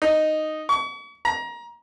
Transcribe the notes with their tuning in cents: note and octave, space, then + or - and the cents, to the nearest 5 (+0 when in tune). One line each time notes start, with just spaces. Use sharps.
D#4 -5
C#6 +40
A#5 +25